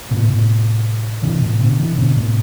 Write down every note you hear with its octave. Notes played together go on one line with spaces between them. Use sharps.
A2 C3
B2
A2 C3
C3 E3
A2 C3
B2 D3
C3 E3
B2 D3
A2 C3